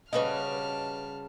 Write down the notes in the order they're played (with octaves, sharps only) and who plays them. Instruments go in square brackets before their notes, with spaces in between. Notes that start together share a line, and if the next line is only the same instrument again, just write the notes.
[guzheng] C#3 G3 F#4 [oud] B4 D#5 [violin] A5 F6